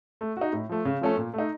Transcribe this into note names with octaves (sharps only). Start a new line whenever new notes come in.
A3
D#4 F#4
A2
F3 A3
C#3
F3 A3 C#4 A4
A#2
A3 D#4